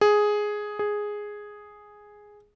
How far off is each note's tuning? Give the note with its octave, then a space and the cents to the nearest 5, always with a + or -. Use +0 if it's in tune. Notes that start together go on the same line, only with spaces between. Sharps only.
G#4 +5
G#4 +0